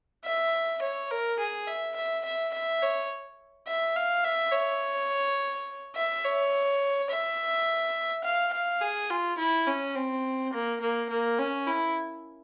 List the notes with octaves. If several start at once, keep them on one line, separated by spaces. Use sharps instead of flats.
E5
C#5
A#4
G#4
E5
E5
E5
E5
C#5
E5
F5
E5
C#5
E5
C#5
E5
F5
F5
G#4
F4
E4
C#4
C4
A#3
A#3
A#3
C#4
E4